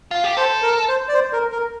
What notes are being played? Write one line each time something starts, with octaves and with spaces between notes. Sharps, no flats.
F4
G4
A4 C5
A#4
C5
D5
C5
A#4
A#4